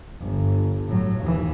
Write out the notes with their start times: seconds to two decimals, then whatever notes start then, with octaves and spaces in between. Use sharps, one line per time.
0.20 G1
0.88 A2 F#3
1.22 D#2 E3